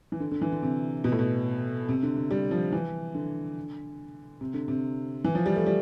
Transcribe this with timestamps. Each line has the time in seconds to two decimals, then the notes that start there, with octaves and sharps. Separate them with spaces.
0.12 E3
0.20 D3
0.31 D3
0.41 E3
0.52 D3
0.63 C3
1.04 B2
1.12 A2
1.19 B2
1.89 C3
2.03 D3
2.16 D3
2.31 G3
2.51 F3
2.72 E3
3.15 D3
4.41 C3
4.54 D3
4.68 C3
5.24 E3
5.35 F3
5.46 G3
5.56 A3
5.67 G3